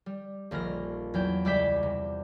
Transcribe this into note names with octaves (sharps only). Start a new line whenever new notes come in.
G3
D#1 A#1 D#3 F6 A#6
E2 F#3 G5
C#2 G3 D5 E5 G5 B6
C3